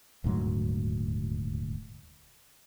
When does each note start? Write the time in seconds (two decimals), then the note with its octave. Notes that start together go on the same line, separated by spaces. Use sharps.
0.24 D#1 D2 G#2 F#3